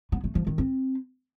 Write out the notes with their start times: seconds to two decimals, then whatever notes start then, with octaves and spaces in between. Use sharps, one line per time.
0.12 B3
0.24 A3
0.35 F3
0.47 D#3
0.58 C4